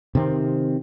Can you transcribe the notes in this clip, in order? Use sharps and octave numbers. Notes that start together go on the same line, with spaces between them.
C3 D#3 C4